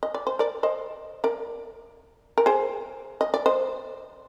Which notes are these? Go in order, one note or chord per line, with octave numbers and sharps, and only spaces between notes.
D#5
D5
C5
A#4 D5
C5 D#5
A#4 D5
A#4
G#4 C5
D#5
D5
C5 D#5